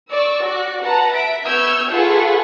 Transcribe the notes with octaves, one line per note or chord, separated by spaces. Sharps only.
D5 C#6 E6
F#4 D5 F#6
B4 F#5 A5 A#5
E5 B6 D7
B3 C#6 E6 F6 G6 G#6
F4 G#4 A4 B4 F#5 C#6